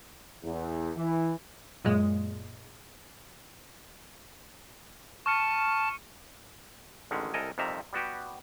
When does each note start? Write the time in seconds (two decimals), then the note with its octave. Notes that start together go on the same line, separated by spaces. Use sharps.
0.44 E2
0.96 E3
1.85 F#2 A#2 G#3
5.26 A5 C#6 F6 C#7
7.11 A1 D3 D#3 G#3 C#4
7.34 C2 A4 A#4 D#5 G#5
7.58 F2 C3 D#3 G3 E5 A#5
7.93 G3 B3 F#4 G4